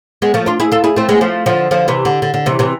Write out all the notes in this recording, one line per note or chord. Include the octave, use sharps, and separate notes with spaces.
G#3 B3
F3 A3
D4 F4
E4 G#4
F4 A4
E4 G#4
A3 C4
G#3 B3
F3 A3
D3 F3
D3 F3
C3 E3
D3
D3
D3
C3 E3
C3 E3